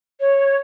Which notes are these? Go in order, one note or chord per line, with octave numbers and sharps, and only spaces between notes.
C#5